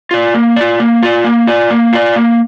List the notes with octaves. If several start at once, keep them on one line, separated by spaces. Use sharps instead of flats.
F4 D5
A#3
F4 D5
A#3
F4 D5
A#3
F4 D5
A#3
F4 D5
A#3